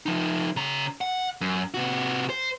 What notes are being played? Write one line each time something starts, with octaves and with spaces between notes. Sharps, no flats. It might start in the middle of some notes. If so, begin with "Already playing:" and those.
F3 D#4
C#3 A#5
F#5
F#2
C3 F#4
C5